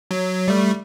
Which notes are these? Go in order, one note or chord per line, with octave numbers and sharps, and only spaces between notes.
F#3
G3 A3